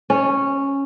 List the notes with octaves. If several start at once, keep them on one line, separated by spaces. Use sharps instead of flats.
C#4